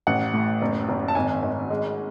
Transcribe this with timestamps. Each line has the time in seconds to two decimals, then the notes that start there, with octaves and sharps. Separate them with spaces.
0.07 A1 F#5
0.33 A2
0.62 F#1
0.89 F#1
1.08 A5
1.15 G#1 G#5
1.42 G#1
1.70 G#3